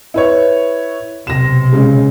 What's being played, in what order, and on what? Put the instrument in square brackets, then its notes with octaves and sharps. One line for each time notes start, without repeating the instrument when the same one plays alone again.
[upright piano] E4 B4 C#5
[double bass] B1 C3 [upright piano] A#6 E7
[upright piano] C#3 G#3